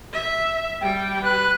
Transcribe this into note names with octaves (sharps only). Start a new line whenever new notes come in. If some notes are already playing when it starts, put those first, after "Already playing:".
E5
G3 G5
B4 F#6